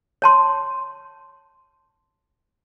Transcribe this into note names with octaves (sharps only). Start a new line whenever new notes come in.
C#5 A5 C6